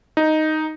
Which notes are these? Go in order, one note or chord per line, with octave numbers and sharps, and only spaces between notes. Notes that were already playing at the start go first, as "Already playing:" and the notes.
D#4